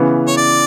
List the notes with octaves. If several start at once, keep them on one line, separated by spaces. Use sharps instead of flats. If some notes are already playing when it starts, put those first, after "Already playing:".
Already playing: C#3 E3 B3
C#5
D5